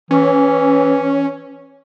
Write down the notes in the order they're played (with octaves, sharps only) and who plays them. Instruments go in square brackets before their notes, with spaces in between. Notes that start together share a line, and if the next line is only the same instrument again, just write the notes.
[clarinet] E3 [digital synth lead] C#4